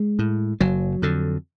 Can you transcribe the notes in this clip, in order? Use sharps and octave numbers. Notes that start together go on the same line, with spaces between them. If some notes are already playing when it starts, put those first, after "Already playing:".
Already playing: G#3
A2
F#1 F#3
F2 D3